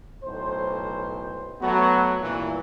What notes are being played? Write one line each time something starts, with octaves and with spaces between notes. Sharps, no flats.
B1 A2 C5
F#3 A3 B3 F#4
C2 G2 A#2 E3